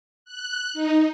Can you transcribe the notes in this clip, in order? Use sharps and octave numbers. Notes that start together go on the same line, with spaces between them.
F#6
D#4